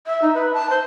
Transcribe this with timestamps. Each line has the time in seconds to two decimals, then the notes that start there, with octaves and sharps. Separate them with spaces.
0.07 E5
0.22 D#4
0.34 B4
0.53 A5
0.70 C5